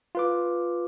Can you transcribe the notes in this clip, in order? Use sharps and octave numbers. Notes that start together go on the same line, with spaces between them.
F4 B4 D6